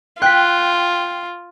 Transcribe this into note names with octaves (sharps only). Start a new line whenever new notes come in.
F4 G5 F#6 B6